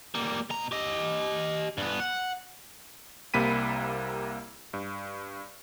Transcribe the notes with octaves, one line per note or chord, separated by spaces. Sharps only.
G3 A#3
B2 A#5
G4 D#5
G2 B3
F#5
C2 C3 A#3 B5 B6 D#7
G2